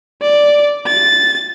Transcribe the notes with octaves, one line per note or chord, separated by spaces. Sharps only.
D5
A6